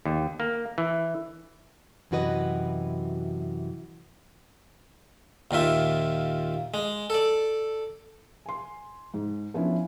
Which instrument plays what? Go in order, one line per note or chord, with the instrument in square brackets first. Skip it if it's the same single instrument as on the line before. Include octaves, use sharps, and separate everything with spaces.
[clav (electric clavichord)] D#2
A#3
E3
[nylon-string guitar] F#2 C3 E3 F#4 B4 D#5
[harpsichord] D#2 A#2 F4 E5
G#3
A4 D5
[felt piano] G#5 C6
G#2
F3 B3 C#4 D4 E4